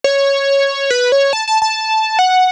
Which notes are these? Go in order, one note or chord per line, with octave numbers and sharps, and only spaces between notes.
C#5
B4
C#5
A5
A5
A5
F#5